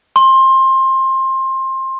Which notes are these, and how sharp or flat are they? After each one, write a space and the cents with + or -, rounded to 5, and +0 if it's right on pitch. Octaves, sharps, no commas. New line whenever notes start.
C6 +20